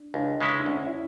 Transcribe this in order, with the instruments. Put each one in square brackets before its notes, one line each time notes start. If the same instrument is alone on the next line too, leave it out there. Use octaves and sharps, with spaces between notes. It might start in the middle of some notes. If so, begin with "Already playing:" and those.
Already playing: [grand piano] D4
[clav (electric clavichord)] C#2 [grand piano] D4
[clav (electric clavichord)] C#3 G#3 C#4 E4
[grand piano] D4
[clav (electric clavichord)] D2 [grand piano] C#4
[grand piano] E4